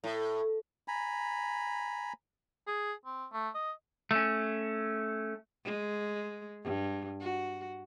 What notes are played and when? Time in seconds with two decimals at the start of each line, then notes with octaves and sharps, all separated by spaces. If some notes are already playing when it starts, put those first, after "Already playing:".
0.04 A2
0.88 G#5 A#5 B5
2.68 G#4
3.06 C4
3.33 A3
3.55 D#5
4.11 A3 C#4
5.64 G#3
6.63 G2
7.20 F#4